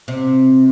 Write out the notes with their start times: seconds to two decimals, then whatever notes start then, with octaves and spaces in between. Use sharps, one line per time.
0.08 C3